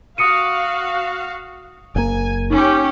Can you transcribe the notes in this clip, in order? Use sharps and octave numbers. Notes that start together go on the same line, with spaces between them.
F#4 F5 D#6 C#7 D#7
F#1 A#3 G#5
C#4 D#4 G4